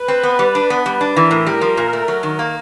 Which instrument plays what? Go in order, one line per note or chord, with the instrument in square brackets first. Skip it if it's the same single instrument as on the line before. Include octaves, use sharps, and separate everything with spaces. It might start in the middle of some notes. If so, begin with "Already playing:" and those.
Already playing: [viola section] B4
[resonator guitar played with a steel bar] C4
B3
G3
D4
B3
G3
D4
[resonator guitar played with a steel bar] E3 [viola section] A#4
[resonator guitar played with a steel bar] A2
G3
F3
A#2
A3
F#3
D#3
A#3